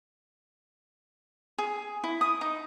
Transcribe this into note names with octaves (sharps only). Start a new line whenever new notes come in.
G#4
E4
D#6
D#4